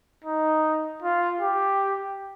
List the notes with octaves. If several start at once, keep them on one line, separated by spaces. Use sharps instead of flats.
D#4
F4
G4